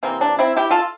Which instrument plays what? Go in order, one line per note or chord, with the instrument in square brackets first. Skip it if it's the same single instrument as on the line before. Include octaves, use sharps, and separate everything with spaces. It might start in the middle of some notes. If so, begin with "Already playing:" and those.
[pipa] C3 E3 A#3 C4
D4
C4 E4
E4 G4
F4 A4